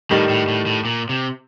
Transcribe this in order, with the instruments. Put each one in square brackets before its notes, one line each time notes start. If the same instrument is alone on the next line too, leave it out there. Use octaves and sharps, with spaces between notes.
[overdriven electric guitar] A2 [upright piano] D#3 G3
[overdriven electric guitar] A2
A2
A2
A#2
C3